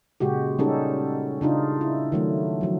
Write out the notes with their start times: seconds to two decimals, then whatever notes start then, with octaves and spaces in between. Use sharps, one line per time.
0.20 A#2 C#3 G#3 F#4 G4
0.59 G3 G#3 C#4 D#4 G4 A4
1.41 C#3 D4 D#4 F4
1.81 E4
2.12 D#3 F#3 A3
2.61 F3 F#3